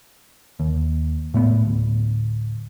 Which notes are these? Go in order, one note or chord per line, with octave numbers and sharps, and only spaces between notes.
D#2
A2 A3 B3
D1